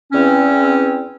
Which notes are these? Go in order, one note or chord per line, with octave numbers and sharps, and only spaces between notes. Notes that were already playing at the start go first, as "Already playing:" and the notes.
E2 C4 C#4